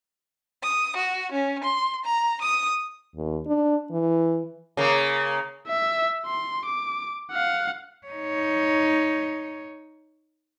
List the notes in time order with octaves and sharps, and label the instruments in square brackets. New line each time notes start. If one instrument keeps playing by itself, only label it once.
[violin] D#6
F#4
C#4
C6
A#5
D#6
[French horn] D#2
D4
E3
[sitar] C#3 A#3
[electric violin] E5
C6
D6
F5 F#5
[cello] D#4 C#5